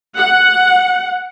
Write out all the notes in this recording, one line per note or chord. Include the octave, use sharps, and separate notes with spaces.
F#5